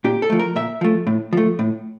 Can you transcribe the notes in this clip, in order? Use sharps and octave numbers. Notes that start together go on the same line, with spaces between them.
A#2 G4
A4
F3 A3
A#4
A#2 E5
F3 A3
A2
F3 A3
A2